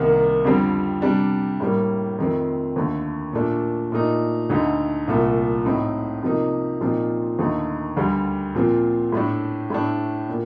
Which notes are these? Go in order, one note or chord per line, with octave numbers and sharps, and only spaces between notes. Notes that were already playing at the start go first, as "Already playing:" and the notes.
Already playing: C2 C3 D#3 A#3
F2 D3 G3 C4
C3 G3 D4
A2 G3 A#3
F2 D#3 A3 C4
D#2 D3 A3
A#2 A3 D4
A#2 A3 D#4
D2 D3 A3 D#4
C2 A#2 A3
A2 A3 C4 D#4
C3 F3 A#3 D#4
A#2 F3 C4 D#4
D#2 D3 A3 D#4
D2 D3 G3
A#2 F3 C4
A2 A3 D4
A2 A3 D4
A#2